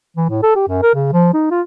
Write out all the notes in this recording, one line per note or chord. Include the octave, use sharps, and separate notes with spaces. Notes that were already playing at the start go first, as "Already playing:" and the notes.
E3
A2
A4
G4
F#2
A#4
C#3
F3
D#4
F4